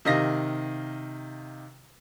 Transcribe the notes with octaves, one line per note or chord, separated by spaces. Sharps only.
C3 D#3 D#5 F5 A#6